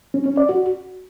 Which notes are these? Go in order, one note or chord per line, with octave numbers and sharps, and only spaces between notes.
C#4
C#4
D5
F#4